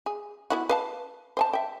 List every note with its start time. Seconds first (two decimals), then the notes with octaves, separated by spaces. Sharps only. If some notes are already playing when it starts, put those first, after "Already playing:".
0.06 G#4
0.50 B3 E4 F#4
0.69 B4 F5 A5
1.37 C5 G#5 A5
1.53 E5 G5